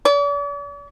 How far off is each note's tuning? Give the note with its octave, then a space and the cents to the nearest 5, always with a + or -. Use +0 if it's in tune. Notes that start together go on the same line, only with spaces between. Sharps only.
D5 -45